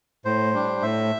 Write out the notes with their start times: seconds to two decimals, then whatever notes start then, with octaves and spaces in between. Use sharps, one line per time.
0.25 A2 C5
0.54 G3 D4
0.82 A2 E5